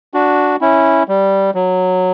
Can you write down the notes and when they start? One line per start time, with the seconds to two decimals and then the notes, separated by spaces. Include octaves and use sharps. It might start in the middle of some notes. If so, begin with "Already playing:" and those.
0.14 D4 F#4
0.61 C#4 E4
1.08 G3
1.55 F#3